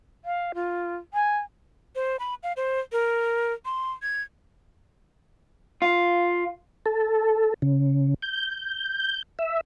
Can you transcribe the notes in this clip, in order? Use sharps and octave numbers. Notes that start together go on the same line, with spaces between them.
F5
F4
G#5
C5
B5
F5
C5
A#4
C6
G#6
F4
A4
C#3
G6
E5